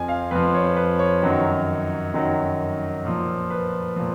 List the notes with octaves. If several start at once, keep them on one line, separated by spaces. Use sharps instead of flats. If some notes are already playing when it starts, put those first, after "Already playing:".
Already playing: F2 F3 G#5
F5
F2 F3 B4
C#5
B4
C#5
F#2 D#3 F#3
F#2 D#3 F#3
A#2 F3
B4
A#2 F3